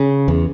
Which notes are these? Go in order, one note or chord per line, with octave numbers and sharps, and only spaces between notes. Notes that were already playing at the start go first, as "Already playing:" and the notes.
Already playing: C#3
E2